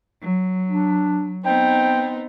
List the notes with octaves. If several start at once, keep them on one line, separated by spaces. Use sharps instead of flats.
F#3
D4
B3 C4 D#4 G5